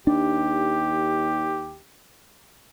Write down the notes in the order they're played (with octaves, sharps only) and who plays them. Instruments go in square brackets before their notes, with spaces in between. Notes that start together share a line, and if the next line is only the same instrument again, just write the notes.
[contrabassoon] D#2 [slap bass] D4 [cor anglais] G4